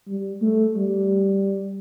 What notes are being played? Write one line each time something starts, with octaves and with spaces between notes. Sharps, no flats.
G3
A3
G3